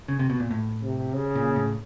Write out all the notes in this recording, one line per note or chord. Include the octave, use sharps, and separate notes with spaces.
C#3
C3
B2
A#2
A2
C3
C#3
A#2
A2